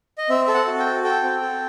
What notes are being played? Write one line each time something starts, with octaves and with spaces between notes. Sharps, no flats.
D#5
C4 E5
A4 E5
F#5
F#4
G5
A4
A4 G5
C4
A4